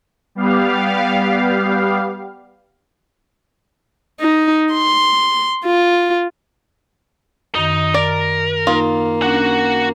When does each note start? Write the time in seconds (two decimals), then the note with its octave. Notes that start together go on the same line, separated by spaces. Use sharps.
0.35 G3 B3 G4 F5
4.20 D#4
4.73 C6
5.65 F4
7.55 F#2 D#3 D#4
7.94 A#4 D5
8.67 A#3 D#4 F4
9.22 C#4 D4 F#4 F#5